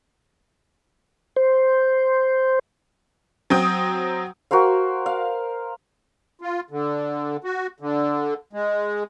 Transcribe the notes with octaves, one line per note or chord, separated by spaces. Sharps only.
C5
F#3 C4 G5 D#6
F#4 A#4 C5 F5
F5
F4
D3
F#4
D3
G#3